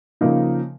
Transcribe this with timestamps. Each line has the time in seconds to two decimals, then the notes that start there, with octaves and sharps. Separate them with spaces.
0.21 C#3 F3 A#3 D#4